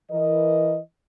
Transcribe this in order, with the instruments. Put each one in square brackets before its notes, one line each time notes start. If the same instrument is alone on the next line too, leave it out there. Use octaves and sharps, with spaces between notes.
[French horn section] E3 A#4 D#5